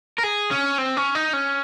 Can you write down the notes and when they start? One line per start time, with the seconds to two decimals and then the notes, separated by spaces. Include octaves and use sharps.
0.18 A#4
0.23 G#4
0.51 C#4
0.78 C4
0.97 C#4
1.15 D#4
1.33 C#4